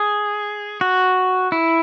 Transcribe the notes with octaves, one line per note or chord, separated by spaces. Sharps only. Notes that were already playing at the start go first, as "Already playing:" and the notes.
Already playing: G#4
F#4
E4